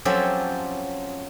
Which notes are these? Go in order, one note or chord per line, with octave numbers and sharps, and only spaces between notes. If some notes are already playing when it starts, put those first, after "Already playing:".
F3 F#3 C4 C#4 G4 A4